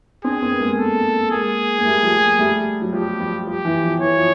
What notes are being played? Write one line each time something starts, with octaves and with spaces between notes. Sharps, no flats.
C4 D4 G#4
A#3 C4
B3
G#3 A#3
A4
G#3 A#3 G#4
A#3
G3 A3
F3 G3
G3 A3
F#3
F3 G3 G4
F3 G3
F3 G4
E3
F3
E3 C#5
F3